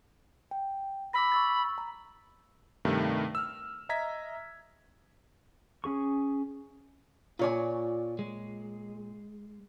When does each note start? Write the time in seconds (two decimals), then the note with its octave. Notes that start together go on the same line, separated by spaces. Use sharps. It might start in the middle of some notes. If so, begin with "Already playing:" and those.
0.51 G5
1.13 B5 D6 E6 A#6
1.32 C#6 E6 A6
1.78 A#5
2.85 G2 C3 D#3 A3
3.35 E6 F6
3.89 D#5 E5 A#5 G#6 B6
5.84 C#4 G#4 C#6
7.39 A#2 F4 C#5 D5 G#5
8.19 G#3